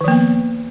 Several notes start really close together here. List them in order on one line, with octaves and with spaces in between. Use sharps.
D#3 F3 A#3 B3